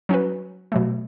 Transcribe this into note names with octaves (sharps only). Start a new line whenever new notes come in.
F#3 C#4 F#4 B4
B2 F#3 A3